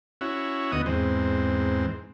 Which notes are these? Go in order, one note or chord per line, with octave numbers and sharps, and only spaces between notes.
C#4 E4 F#4
D2 B3 F#4 D#5 D#6
E2 G#2 C4